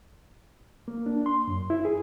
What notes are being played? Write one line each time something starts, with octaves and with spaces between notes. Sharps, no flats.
A#3
D4
C6
F#2
E4
G#4